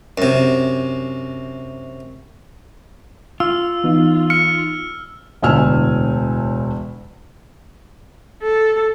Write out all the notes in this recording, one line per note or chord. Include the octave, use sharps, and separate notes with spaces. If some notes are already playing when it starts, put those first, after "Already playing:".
F#2 C3
F4 E6
E3 B3 D#4
F6 C#7
E1 D2 A2 G#5 E6 F6
A4